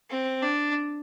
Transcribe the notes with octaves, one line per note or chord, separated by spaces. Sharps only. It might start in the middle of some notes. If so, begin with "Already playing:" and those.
C4
D4